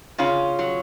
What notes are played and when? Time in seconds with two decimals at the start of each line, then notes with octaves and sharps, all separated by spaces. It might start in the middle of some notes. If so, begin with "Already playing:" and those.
0.18 C#3 C#4 F4
0.59 F#3